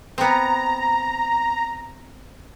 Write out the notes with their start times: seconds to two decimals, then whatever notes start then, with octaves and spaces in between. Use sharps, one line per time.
0.18 B3 C4 A#5